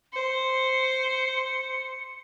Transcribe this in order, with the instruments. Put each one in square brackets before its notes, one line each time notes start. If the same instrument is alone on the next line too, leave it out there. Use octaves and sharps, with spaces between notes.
[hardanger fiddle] C5 [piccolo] C#7